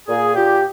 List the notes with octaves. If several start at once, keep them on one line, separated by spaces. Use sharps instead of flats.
A#2 G#4
A#2 G4